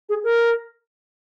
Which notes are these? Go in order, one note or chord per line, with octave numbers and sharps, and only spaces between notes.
G#4
A#4